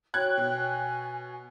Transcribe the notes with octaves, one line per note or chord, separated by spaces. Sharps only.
F#4 C#5 G5 F#6 G#6
B2
G#5